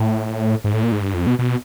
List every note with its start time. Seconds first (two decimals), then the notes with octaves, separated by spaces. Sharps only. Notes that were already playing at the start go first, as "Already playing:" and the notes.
Already playing: A2
0.64 G#2
0.74 A2
0.83 A#2
0.92 G#2
1.02 G2
1.14 F2
1.27 B2
1.39 B2